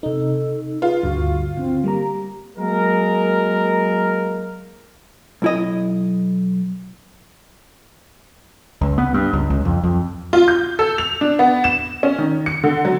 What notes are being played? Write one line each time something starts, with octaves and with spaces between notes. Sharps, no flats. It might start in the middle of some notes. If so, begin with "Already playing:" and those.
C3 D#4 A4
F4 G#4 B4
D2 G2 D3 F#4
D3 C4
G3 A#3 G4 A#5
F#3 G#3 A#3 A#4
B1 E4 D#5
C#2
B3
G2
C#2
C#2
F2
F2
F4
G6
A4
F7
D4
B3
E7
C#4
D#3
C#7
D3
F#3